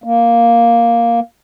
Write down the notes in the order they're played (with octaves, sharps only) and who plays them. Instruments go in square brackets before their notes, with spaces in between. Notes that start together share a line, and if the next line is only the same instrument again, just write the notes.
[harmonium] A#3